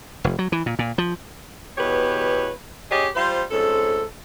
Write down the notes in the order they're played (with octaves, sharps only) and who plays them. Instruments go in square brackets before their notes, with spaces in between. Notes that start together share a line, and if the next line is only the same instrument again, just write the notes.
[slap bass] F1
F#3
E3
A#2
A#2
F3
[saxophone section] E2 B2 G4 B4 C#5
C#4 G4 G#4 C#5 D#5
G3 F4 C5
F2 G#2 C#4 A4